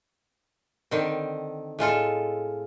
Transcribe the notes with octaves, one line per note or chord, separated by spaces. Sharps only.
D3 D#3 C4
A2 G#3 F4 A4